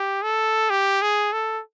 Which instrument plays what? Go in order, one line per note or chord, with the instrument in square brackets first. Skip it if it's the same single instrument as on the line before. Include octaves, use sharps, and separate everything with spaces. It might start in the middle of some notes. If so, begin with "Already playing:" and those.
Already playing: [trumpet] G4
A4
G4
G#4
A4